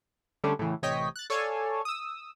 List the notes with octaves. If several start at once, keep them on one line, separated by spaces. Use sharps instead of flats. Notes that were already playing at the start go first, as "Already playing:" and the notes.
D3 G3 A3 C#4 D4
A2 C#3 E3
A1 C3 C#5 D#5 G5 B6
F#6 A6
A4 C#5 D5 F5 G#5 A5
D#6 E6